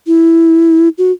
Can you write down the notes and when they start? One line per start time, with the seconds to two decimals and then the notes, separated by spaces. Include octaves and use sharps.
0.07 E4
0.98 F#4